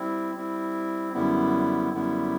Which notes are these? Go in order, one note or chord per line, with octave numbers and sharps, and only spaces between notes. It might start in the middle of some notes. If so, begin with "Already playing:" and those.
Already playing: G3 C4 E4
G3 C4 E4
F#2 D3 G3 B3 E4
F#2 D3 G3 B3 E4